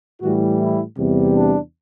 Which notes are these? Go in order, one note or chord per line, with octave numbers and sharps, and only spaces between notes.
A2 E3 G3 F#4
E4
E2 C3 G3
D4